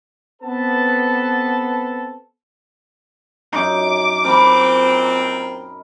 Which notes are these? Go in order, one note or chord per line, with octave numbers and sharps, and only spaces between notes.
B3 C4 A4 B4 A5
F#2 D#4 D6
A#2 C4 A#4 A#5 B5